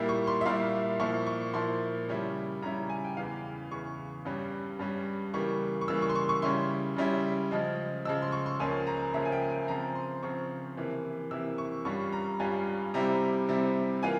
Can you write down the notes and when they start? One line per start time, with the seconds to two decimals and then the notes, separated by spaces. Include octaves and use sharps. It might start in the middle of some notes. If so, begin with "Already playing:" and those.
Already playing: A#2 G3 A#3 E4
0.09 C#6
0.27 C6
0.41 E5
0.45 A#2 G3 A#3 E4 F5
1.00 A#2 F3 A#3 E4 C#6
1.27 C#6
1.53 A#2 F3 A#3 E4 C6
2.08 C#3 G3 C#4 E4
2.62 C#3 G3 C#4 E4 A#5
2.89 G#5
3.04 G5
3.17 E2 C#3 E3 F5
3.71 E2 C#3 E3 C#6
4.25 G2 G3 C#4
4.79 G2 G3 C#4
5.34 C#3 E3 G3 A#3 C#6
5.81 C#6
5.88 C#3 E3 G3 A#3 E6
6.02 C#6
6.09 C6
6.15 C#6
6.29 C#6
6.42 C#3 G3 C#4 E4 C6
6.96 C#3 G3 C#4 E4
7.51 C#3 F3 G#3
8.05 C#3 F3 G#3 E6
8.22 C6
8.32 C#6
8.46 C6
8.60 C#2 C#3 F3 A#3 C#4 G#5
8.87 A#5
9.14 C#2 C#3 F3 A#3 C#4 E5
9.25 G#5
9.32 G5
9.50 G#5
9.68 C#3 F3 C4 A#5
9.95 C6
10.23 C#3 F3 C4 C#6
10.77 C3 E3 A#3 E4
11.31 C3 E3 A#3 E4 E6
11.58 C#6
11.85 G2 G3 C#4 F4 C#6
12.13 A#5
12.40 G2 G3 C#4 F4 G#5
12.94 C3 G3 C4 E4 A#5
13.48 C3 G3 C4 E4
14.03 E3 A#3 F4 G#5